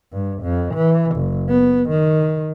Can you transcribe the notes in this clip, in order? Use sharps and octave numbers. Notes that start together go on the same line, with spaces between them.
G2
F2
E3
F#1
B3
D#3